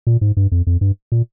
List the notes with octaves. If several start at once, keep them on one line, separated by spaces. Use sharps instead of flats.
A#2
G#2
G2
F2
F2
G2
A#2